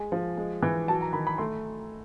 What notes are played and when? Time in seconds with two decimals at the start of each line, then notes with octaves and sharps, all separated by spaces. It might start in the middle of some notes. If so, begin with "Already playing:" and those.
Already playing: G#3 G#5
0.12 F3
0.37 G#3
0.63 E3
0.88 F#3 A5
1.01 A#5
1.13 D#3 B5
1.27 B5
1.38 A3 C6